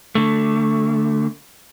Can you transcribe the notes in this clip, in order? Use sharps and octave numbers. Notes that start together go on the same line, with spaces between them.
D3 A3